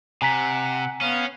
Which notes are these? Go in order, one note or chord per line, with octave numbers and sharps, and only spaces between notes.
C3 F#5 G#5 A#5 B6
B3 C#4 F5